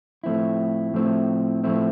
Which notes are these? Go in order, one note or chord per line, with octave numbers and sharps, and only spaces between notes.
A2 F3 A3 C4 E4
A2 F3 A3 C4 E4
A2 F3 A3 C4 E4